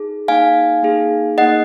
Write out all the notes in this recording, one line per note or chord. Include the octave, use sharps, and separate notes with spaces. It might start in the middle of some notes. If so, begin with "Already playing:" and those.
Already playing: D#4 G#4
A#3 D#4 G#4 F5 G#5
A#3 D#4 G#4
A#3 D#4 G#4 D#5 F#5